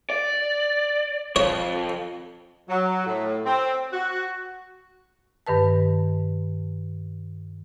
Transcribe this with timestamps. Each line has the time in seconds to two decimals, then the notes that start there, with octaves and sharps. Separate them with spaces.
0.10 D5
1.36 F2 C#5
2.69 F#3
3.06 A2
3.45 C4
3.93 F#4
5.47 G2 D#3 B4 A5